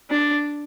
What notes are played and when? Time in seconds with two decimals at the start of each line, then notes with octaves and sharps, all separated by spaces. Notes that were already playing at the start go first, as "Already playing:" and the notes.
0.10 D4